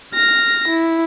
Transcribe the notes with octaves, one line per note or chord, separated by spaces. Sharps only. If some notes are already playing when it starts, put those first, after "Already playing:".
F6 A#6
E4